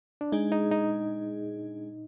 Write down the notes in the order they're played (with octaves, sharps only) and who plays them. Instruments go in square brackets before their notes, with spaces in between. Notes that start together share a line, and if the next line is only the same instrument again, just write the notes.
[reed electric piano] D4
[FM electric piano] G#3 D4 G#4 [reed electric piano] D#4
[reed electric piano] D#4
D#4